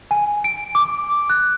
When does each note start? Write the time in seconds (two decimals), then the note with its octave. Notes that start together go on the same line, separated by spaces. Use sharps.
0.11 G#5
0.44 D7
0.75 D6
1.30 F#6